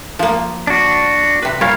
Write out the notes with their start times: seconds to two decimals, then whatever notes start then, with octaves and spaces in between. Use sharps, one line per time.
0.19 F3 A#3
0.67 D4 F#4
1.42 C3 B4
1.61 A#2 G3 C#5 F5